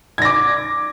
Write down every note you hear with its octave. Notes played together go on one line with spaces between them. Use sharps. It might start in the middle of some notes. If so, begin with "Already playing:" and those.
D6 G#6 A#6